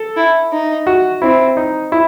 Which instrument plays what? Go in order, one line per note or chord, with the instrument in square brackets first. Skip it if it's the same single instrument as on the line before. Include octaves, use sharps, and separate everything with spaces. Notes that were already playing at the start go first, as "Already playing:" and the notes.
Already playing: [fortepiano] A4
[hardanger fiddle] E4
D#4
[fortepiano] F#4
[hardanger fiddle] C4 [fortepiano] E4
[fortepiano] D#4
E4